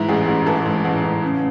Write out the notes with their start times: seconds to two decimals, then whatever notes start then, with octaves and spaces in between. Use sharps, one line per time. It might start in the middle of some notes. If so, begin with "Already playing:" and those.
Already playing: G#2 E3 E4
0.09 A1 G#4
0.27 A1
0.46 E3 A4
0.65 G#2
0.85 A1
1.03 A1
1.23 C#3